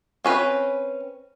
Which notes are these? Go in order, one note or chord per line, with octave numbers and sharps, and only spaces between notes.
C4 C#4 B4